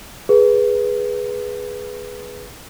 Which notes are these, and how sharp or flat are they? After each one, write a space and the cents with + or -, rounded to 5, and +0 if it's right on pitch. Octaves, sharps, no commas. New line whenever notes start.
G#4 +0 B4 -10